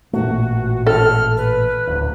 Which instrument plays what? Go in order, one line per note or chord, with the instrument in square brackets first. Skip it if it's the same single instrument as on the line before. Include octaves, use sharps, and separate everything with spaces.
[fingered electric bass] A1 A#2 A3 [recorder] F#4
[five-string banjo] A4 [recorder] F6
[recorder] B4
[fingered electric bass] D1 D2